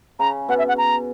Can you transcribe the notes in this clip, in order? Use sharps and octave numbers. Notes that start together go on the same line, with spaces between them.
C#3 A#5
B2 F#5
E5
F#5
A#5